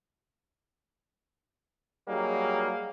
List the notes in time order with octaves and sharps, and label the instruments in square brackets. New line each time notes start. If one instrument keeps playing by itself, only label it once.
[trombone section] F#3 G3 A#3 D#4 G#4